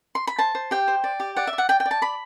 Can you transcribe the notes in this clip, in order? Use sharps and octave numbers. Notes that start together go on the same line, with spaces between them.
C6
B5
C5 A5
C5
G4 G5
C5
D5
G4
D5 F#5
E5
D5
F#5
D5 G5
G5
D5
A5
D5 B5